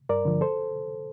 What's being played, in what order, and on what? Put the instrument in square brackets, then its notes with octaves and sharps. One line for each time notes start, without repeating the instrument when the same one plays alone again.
[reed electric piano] G2 A#4 D5
D3 F3
A4 C5